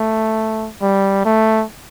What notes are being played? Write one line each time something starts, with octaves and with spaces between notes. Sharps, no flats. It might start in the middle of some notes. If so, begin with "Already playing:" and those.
Already playing: A3
G3
A3